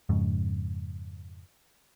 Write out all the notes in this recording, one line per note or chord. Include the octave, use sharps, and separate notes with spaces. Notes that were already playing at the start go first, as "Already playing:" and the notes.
F2 G#2 C#3